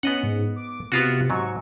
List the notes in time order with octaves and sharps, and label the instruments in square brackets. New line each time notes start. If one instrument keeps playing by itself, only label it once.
[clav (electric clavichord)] B3 D#5 F#5 [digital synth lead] C#4
[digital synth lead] G#2
D6
[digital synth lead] C3 [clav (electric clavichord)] B3 F4 F#4
[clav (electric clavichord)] G#2 F#3 [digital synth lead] C#6